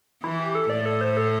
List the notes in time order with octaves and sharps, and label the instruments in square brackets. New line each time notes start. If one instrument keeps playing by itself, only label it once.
[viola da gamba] E3 [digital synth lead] E4
[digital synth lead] G4
A4
[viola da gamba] A2 [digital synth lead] D5
[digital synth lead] A4
C5
A4